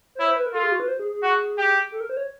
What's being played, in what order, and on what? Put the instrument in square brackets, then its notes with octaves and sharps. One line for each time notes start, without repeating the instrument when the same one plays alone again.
[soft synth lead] C5
[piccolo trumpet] E4 [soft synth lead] C#5
[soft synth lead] C5
B4
A#4
[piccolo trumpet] F4 [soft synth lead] A4
[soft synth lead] G#4
F#4
B4
C5
G#4
G#4
[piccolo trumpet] F#4
G4
[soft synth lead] A4
A#4
C5
C#5